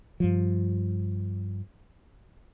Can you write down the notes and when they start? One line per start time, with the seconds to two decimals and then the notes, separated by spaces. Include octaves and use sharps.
0.20 G2 F3